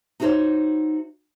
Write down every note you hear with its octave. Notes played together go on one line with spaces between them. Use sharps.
D#4 E4 F#4 G#4 C5 C#5